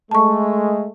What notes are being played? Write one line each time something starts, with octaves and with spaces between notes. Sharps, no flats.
G#3 A3 A5 C#6